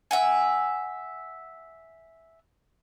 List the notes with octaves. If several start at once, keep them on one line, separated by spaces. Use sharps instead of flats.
E5 F#5 G#5